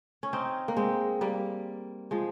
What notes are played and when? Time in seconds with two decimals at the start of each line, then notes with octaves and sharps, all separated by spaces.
0.23 C#4
0.33 C4 D#4
0.68 A#3
0.77 G#3 C4
1.21 G3 A#3
2.11 F3 G#3